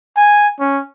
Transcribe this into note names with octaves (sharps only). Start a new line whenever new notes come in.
G#5
C#4